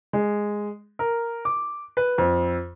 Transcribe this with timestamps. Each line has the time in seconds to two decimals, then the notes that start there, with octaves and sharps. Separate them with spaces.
0.13 G#3
0.99 A#4
1.45 D6
1.97 B4
2.18 F2